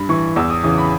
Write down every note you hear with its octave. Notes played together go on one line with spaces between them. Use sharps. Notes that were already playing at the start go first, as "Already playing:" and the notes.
Already playing: G2 B5
E3 C#6
E2 E6
D#6
C#3 E3 D#6
B5